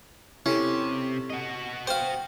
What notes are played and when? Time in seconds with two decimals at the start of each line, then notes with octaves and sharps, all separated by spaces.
0.46 C3 C#4 E4 G4 A4
1.30 F#4 D#5
1.87 C5 F5 G5